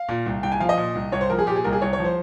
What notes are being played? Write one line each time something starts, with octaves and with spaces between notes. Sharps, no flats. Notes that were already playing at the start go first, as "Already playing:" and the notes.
Already playing: F5
A#2
C2
C2 G5
G#5
F3 F5
D#5
A#2
C2
C2 C#5
C5
F3 A#4
G#4
A#2 G4
G#4
C2 A#4
G#4
C2 C#5
C#5
F3
C5